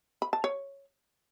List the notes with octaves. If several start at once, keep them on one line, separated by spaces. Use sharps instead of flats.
B5
A5
C#5